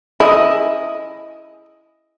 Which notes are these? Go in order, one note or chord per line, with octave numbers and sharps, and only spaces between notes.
E4 G#4 D#5 D#6